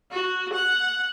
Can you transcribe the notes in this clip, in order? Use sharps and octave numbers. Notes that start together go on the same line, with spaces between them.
F#4
F#5